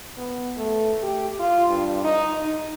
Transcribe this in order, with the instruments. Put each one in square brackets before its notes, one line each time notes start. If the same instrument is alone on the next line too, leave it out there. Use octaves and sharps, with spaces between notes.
[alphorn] B3
A3
G4
F4
G2
D#4
D#4